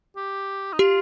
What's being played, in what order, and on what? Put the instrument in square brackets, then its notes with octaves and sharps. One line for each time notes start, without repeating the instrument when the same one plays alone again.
[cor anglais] G4
D#4
[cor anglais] F4 [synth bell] G4